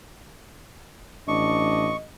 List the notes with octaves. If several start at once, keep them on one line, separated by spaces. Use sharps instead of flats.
A1 D4 D#5 C#6